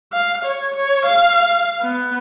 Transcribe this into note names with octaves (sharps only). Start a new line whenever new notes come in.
F5
C#5
C#5
F5
B3